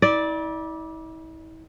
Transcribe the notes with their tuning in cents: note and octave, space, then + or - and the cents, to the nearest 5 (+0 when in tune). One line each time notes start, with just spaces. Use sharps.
E4 -40 D5 +0